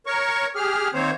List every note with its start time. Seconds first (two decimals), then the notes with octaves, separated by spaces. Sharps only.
0.06 A#4 C#5 C#6
0.55 G4 G#4 F6
0.94 D#3 A#3 C4 C5 C#5